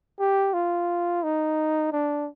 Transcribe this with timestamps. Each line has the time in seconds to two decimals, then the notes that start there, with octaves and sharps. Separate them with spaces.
0.20 G4
0.54 F4
1.24 D#4
1.92 D4